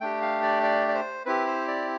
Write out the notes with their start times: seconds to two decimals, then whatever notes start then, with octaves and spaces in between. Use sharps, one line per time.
0.01 A3 D4 G4 G5
0.22 F5
0.43 D5
0.63 D5
0.88 D5
0.95 C5
1.26 C4 E4 G4 B4
1.47 C5
1.68 D5